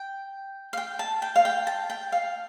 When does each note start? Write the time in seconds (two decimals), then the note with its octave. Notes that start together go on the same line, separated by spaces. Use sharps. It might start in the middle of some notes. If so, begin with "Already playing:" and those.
Already playing: G5
0.73 F5
0.77 G5
0.99 A5
1.22 G5
1.36 F5
1.45 G5
1.67 A5
1.90 G5
2.12 F5